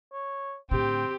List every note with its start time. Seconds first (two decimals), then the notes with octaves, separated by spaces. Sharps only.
0.13 C#5
0.71 A2 D3 C4 G4